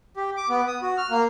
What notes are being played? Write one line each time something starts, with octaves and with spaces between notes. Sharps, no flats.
G4
D6
B3
D#6
F#4
F6
A#3